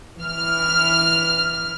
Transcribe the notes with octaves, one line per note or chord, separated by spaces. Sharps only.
E3 F6